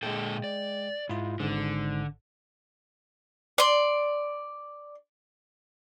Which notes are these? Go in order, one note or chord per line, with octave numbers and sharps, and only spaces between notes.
A#2 D3 G#3 A4 G5
D5
G#2 E4 F4
G#1 G#2 D3
D5 C6